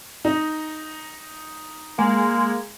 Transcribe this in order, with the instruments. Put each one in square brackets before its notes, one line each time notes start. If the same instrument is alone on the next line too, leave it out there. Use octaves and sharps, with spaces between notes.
[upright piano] D#4
[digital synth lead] G#3 [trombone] A#3